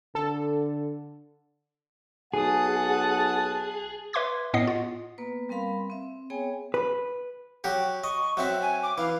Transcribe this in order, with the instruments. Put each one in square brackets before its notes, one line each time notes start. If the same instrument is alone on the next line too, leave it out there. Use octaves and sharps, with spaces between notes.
[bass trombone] D3 [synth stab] A4
[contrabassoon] B1 [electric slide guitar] G#4 [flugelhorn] F#5 [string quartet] A5 D#6 F#6
[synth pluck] B4 E5 C6 D6 G#6
A2 B3 D#5 F#5 D#6 C7
F4
[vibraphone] A#3 B3 B4
G3 C4 A#4 F5 B5 C6
C4 E5
B3 G#4 C#5 G5 G#5
[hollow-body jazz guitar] B4
[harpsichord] F#3 F#4 G4
[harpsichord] D#5 [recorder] C#6
[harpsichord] F#3 C4 F#4 [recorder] E5
[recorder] G#5
D6
[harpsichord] E3 [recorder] F5